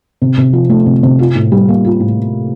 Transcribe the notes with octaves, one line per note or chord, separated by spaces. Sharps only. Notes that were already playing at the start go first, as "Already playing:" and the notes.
C3
C3
F3
A3
C3
C3
F4
A2
G3
A#3
F4
A2